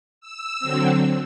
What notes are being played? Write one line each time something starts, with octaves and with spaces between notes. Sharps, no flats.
E6
D3 F#3 C4